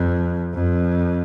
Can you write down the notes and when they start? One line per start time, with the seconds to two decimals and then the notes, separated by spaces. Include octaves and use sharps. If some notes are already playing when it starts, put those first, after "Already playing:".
Already playing: F2
0.54 F2